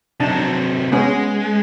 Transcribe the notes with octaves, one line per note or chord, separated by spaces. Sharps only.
C3 F#3 D4 D#4 A5
G#3 B3 C#4 G#4